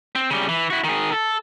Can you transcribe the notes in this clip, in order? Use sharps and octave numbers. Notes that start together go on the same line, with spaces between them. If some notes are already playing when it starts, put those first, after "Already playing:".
C4
C#3 G3
E3
E4 F#4
D#3 G#4
A4